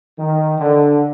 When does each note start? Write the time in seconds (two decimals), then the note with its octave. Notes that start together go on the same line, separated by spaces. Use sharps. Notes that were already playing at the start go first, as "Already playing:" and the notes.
0.19 D#3
0.59 D3